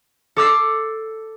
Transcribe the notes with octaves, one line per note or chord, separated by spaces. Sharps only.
A4 D6 E6 C7